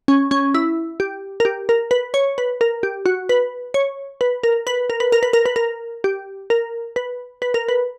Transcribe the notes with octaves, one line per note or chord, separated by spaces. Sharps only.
C#4
C#4
E4
G4
A#4
G4
A#4
B4
C#5
B4
A#4
G4
F#4
B4
C#5
B4
A#4
B4
A#4
B4
A#4
B4
A#4
B4
A#4
G4
A#4
B4
B4
A#4
B4